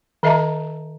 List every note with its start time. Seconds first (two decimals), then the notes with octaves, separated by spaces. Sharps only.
0.23 D#3 A4 D#5 E5 A5 A#5